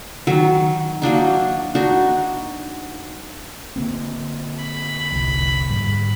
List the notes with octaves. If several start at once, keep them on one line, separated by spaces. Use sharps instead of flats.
D#3 F#3
F#3 A#3 D4 D#4
D4 D#4 F#4
D3 A#3 C4
B5
F1 C2 F2
G#2 G3